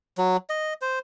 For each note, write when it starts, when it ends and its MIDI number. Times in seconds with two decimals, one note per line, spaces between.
0.18 0.37 54
0.49 0.74 75
0.82 0.99 72